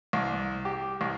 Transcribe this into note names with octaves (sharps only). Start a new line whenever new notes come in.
C2
G4
C2